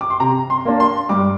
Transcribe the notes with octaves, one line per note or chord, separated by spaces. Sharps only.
D6
C6
C3 A#5
C6
A#3 D4
C6
G2 D6